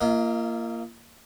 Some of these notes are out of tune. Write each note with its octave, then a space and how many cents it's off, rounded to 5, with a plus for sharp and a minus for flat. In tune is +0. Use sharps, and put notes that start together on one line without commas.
A#3 -10 F4 -35 D#5 +30